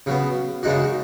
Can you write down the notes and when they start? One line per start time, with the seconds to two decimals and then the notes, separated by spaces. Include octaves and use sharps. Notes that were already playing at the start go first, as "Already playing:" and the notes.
0.06 C#3 F#3 B3
0.63 F#2 C#3 G#3 D#4 F#4